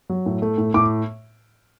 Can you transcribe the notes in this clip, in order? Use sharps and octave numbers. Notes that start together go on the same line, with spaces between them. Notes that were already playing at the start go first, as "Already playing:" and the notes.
F#3
A2
A3
A2
A2 D6